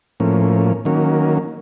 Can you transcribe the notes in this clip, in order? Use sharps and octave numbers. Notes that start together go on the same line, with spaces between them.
A2 F3 A#3 C#4
D#3 F#3 A#3 C#4